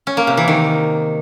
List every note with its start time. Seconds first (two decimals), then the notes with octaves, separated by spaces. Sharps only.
0.07 C#4
0.17 A#3
0.27 C3
0.37 E3
0.48 D#3